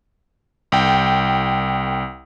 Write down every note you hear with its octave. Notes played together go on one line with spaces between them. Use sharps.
C2 G5